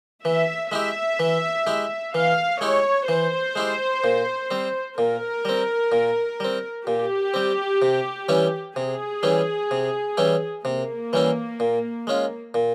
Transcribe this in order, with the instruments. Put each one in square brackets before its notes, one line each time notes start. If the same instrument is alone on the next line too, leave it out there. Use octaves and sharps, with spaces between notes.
[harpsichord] E3 [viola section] E5
[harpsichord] G#3 E4 G4 [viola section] E5
[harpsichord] E3
G#3 E4 G4
[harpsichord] E3 [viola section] F5
[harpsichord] G#3 E4 G4 [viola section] C#5
[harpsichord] E3 [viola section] C5
[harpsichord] G#3 E4 G4
A#2
G3 C4
[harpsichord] A#2 [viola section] A#4
[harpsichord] G3 C4
A#2
G3 C4
[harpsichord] A#2 [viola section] G4
[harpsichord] G3 C4
C3
E3 G3 C#4 E4
[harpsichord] C3 [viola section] G#4
[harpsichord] E3 G3 C#4 E4
C3
E3 G3 C#4 E4
[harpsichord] C3 [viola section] A#3
[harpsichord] E3 G3 C#4 E4
A#2
G#3 C#4 F4
A#2